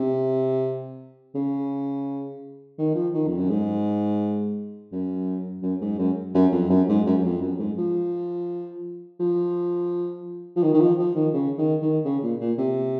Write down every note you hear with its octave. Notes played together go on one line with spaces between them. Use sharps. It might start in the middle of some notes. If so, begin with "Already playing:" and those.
Already playing: C3
C#3
D#3
F3
D#3
F2
F#2
G#2
F#2
F#2
G#2
F#2
F#2
F2
F#2
G#2
F#2
F#2
F2
F#2
G#2
F3
F3
F3
D#3
D#3
F3
F3
D#3
C#3
D#3
D#3
C#3
A#2
A#2
C3